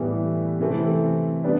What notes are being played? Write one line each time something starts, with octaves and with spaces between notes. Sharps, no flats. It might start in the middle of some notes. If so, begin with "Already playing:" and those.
Already playing: A2 E3 G3 B3
C3 E3 A3 C4
G3 B3 D4